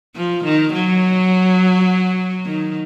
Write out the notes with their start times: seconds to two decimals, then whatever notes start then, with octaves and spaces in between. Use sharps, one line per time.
0.16 F3
0.44 D#3
0.73 F#3
2.46 D#3